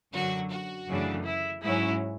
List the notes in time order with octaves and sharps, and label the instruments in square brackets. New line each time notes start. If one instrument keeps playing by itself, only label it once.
[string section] F#2 D3 F#3 F#4
F#4
F#2 C#3 E3 A3 D4
E4
G#2 F#3 C#4 E4